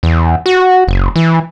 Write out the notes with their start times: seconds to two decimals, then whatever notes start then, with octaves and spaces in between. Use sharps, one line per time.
0.03 E2
0.46 F#4
0.88 F#1
1.16 E3